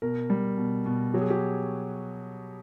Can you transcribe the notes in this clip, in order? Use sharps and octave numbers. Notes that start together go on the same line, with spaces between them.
B2 A#4
G3
B2
B2
F#3 G4
G#4
G4